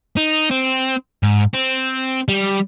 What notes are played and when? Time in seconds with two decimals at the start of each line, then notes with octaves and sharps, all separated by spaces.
0.17 D#4
0.50 C4
1.23 G#2
1.54 C4
2.28 G3